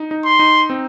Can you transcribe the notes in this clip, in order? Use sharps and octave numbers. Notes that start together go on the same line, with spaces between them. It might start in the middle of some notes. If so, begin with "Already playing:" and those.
Already playing: D#4
D#4
C6
D#4
C4